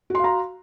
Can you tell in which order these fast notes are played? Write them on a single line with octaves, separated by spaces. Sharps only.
F#4 C6 F5 A#5